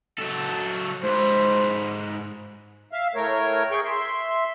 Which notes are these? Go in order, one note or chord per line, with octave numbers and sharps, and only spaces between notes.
F#3 A4
G#2 B4 C5
E5 F5
A2 A3 A#4 C#5
G#4 G5 C#6 G6
E5 C6